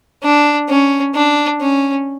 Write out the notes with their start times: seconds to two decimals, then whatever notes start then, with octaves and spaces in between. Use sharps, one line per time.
0.23 D4
0.69 C#4
1.15 D4
1.61 C#4